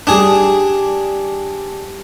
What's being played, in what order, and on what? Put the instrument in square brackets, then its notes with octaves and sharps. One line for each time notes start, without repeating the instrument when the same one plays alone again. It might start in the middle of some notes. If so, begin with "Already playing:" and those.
[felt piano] G3 E7 [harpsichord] D4 G#4